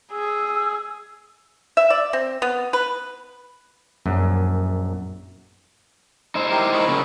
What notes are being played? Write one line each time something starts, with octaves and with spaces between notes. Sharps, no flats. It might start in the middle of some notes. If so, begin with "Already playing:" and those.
G#4 E6
E5
D5
C4
B3
B4
A#1 F#2
D#4 E4 C5
G4 A#4 C6
D#5 B5 C#6
C#3 A#3